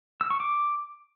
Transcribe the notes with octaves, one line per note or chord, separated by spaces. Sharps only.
E6
C#6
D6